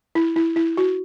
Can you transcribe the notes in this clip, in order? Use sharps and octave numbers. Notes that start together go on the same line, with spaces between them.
E4
E4
E4
F#4